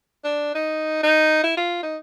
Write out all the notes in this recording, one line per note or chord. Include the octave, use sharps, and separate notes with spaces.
D4
D#4
D#4
E4
F4
D#4